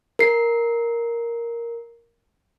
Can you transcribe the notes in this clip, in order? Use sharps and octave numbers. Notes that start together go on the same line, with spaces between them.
A#4 C7